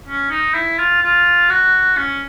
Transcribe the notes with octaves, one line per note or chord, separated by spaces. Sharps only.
C#4
D#4
E4
F4
F4
F#4
C#4